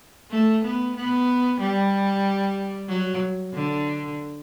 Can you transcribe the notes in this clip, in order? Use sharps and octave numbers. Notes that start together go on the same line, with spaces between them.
A3
B3
B3
G3
F#3
D3